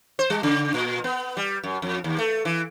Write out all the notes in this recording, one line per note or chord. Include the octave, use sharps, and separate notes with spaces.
C5
G3
C#3
A#2
B3
G3
F#2
F2
D#2
A3
E3